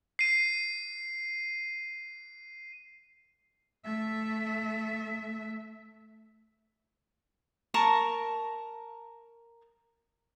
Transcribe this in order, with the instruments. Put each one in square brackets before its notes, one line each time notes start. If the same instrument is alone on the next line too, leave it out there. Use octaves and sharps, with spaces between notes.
[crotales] C7 D#7
[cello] A3 E5
[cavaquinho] A#4 A5 A#5 C#6